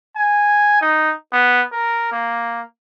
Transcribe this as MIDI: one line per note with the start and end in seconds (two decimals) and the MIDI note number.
0.16 0.77 80
0.82 1.12 63
1.33 1.61 59
1.72 2.09 70
2.12 2.61 58